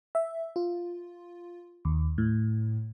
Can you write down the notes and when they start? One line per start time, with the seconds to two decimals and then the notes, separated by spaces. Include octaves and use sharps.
0.15 E5
0.56 F4
1.85 D#2
2.18 A2